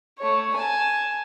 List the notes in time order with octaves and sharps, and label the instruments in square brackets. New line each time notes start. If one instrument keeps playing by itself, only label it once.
[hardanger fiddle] A3 C#5
G#5 A5